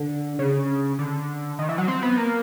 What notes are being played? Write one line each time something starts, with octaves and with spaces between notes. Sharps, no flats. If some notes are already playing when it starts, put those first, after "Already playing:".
Already playing: D3
C#3
D3
D#3
E3
F#3
C4
B3
A#3